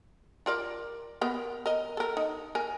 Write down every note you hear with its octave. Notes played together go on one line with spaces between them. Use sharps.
F4 A#4 D5
B3 A#4
A#4 D#5
A4 A#4
D#4
A#4 G#5